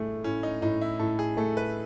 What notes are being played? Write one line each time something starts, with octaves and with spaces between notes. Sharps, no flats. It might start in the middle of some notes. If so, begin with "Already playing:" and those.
Already playing: A2 A3 G#4
A2 C#4
D#4
A2 D#4
E4
A2 A4
G#4
A3 A4
B4